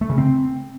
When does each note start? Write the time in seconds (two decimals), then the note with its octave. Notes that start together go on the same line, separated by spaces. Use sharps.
0.01 A3
0.09 C#3
0.18 C4